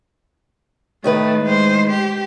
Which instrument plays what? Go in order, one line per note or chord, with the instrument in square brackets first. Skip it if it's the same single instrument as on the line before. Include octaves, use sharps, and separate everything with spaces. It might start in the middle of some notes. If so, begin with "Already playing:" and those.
[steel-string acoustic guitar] A2 D#3 B4 [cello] A3
[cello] G#3 C5
G4